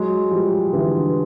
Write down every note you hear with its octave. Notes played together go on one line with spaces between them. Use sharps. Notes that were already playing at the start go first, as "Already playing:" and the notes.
Already playing: F#3 G#3
F3 G3
D3 E3